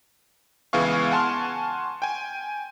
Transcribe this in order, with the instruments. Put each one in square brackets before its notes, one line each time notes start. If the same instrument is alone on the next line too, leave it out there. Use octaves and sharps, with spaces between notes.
[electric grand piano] C#2 E3 B3 G#4 F5 C#6
F#5 G#5 A5 C6 C#6 F6
G5 G#5